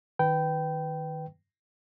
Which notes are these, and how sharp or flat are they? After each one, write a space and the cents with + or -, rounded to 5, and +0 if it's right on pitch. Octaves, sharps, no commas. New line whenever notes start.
D#3 +0 B4 +10 G5 -15